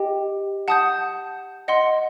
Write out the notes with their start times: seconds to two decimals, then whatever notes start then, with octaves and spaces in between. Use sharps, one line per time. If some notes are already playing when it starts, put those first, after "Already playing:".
Already playing: G4 D#5 G5
0.68 F#5 A5 D#6 G6
1.68 D#5 F#5 C6